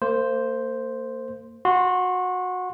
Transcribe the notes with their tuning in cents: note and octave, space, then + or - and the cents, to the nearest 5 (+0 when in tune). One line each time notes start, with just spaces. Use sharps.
A#3 -35 C5 +0
F#4 -20 C6 +0